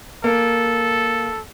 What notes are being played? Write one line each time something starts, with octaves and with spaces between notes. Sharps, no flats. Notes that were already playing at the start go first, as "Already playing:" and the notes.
A#3 A4